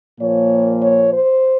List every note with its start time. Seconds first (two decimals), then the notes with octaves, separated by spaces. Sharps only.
0.19 A#2 F3 A#3 C#5
0.82 C#5
1.14 C5